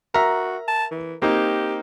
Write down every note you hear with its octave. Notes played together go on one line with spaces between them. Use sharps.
F#4 A#4 E5 A#5
A5
E3
A#3 C4 D#4 G4